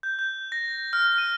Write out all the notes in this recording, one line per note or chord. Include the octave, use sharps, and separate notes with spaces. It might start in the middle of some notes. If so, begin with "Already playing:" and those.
G6
G6
A#6
F6
D#7